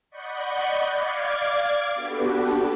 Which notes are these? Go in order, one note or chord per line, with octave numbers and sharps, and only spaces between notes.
D5 D#5 F#5 B5 C#6 G6
D5 F5 D6 G#6
B3 D4 F#4 G4 A4 B4